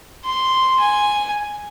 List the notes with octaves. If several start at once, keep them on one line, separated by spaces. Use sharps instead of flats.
C6
G#5